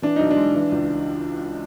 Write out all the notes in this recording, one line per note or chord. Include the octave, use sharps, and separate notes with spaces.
E3 D4
B1 D#4
D4
G#3
E3
C#2